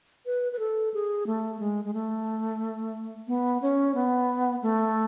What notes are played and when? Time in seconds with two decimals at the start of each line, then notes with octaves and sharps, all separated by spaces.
0.26 B4
0.52 B4
0.59 A4
0.94 G#4
1.27 A3
1.60 G#3
1.85 G#3
1.94 A3
3.28 B3
3.62 C#4
3.95 B3
4.63 A3